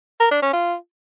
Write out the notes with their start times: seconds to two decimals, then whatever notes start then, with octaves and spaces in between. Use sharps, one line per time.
0.20 A#4
0.31 D4
0.42 C#4
0.53 F4